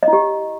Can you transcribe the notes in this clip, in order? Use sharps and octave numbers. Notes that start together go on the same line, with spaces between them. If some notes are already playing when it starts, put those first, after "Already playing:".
D#5
E4
G4